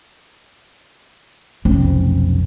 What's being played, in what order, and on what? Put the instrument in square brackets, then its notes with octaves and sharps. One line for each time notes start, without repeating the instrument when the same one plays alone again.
[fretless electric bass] F1 B1 C4 [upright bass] C#4